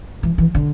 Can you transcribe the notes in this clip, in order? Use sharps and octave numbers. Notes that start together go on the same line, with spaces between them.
E3
E3
D3